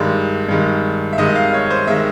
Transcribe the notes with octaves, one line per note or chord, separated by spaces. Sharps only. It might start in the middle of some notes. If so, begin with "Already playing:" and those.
Already playing: G2 D#3 G#3 D5
G2 D#3 G#3
E5
G2 D#3 G#3 D#5
F5
C#5
C5
D#3 G#3 E5